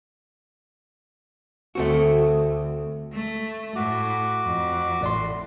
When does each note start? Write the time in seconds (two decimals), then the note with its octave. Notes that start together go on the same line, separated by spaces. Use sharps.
1.75 D2 A3 C4 F#4
3.13 A3
3.76 A2 F#4 D6
4.44 F2
5.01 A1 A2 D5 C6